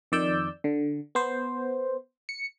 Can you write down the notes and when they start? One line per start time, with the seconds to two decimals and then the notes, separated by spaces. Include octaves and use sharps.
0.12 F2 D#3 D5 E6 G6
0.64 D3
1.15 B3 C5
2.29 C#7